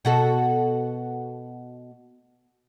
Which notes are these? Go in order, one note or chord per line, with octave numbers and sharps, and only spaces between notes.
B2 F#4 A4